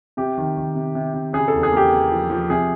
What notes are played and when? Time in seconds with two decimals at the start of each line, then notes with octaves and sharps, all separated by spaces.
0.17 C3 G4
0.38 D#3
0.57 D#3
0.75 C3
0.95 C3
1.14 C3
1.33 C#3 G#4
1.48 E2 A4
1.63 G#4
1.72 A#3
1.77 G4
1.92 A#3
2.11 F3
2.30 F3
2.50 C3 G#4